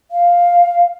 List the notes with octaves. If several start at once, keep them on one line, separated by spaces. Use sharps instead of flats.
F5